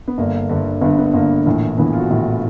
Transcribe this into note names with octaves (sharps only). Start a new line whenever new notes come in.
B3
G1 G2 D3 A#3
G1 G2 D3
G1 G2 D3 B3
B3
G1 G2 D3 A#3
A#1 A2 E3
A#1 A2 E3 B3
F4
F#4
A#1 A2 E3